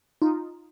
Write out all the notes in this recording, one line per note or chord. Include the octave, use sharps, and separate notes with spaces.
D#4 F4